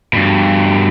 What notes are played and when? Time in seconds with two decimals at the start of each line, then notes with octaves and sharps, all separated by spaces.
0.13 G2 B2